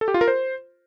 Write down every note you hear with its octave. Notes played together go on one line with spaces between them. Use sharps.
A4
G4
F4
A#4
C5